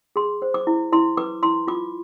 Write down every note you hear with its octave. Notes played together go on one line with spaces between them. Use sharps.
G#4 C6
C5
D6
E4
E4 C6
B4 D6
E4 C6
F4 D6